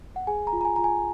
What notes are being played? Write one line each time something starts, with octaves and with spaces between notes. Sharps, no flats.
F#5
G#4 G#5
A#5
F4
A#5
G#5
F4 A#5
G#5